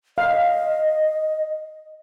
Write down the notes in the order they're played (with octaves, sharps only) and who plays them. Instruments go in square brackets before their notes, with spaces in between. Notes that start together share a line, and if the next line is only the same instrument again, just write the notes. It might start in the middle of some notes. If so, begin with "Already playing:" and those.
[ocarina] D#5 [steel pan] F5